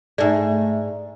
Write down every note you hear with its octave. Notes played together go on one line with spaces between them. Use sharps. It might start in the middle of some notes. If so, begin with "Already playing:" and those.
G#2 A3 D5